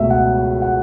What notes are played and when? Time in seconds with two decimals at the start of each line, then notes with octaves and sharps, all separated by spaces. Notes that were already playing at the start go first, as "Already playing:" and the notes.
Already playing: C#2 B2 A3 E5
0.10 F#5
0.62 F#5